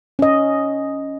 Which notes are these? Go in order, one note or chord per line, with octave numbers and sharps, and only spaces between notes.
C#4 D#5